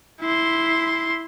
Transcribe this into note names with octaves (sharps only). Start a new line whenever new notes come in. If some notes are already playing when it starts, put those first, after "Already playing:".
E4 C6